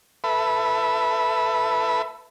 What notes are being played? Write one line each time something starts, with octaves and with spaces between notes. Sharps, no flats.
A4 B4 E5 B5